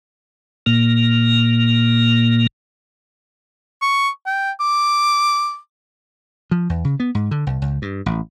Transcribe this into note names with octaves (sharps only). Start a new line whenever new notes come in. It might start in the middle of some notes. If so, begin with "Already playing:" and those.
A#2 A#3
C#6
G5
D6
F3
E2
C#3
B3
G#2
D3
C2
C#2
G2
A1